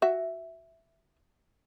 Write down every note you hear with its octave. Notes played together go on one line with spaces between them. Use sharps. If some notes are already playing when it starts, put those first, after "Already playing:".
F#4 E5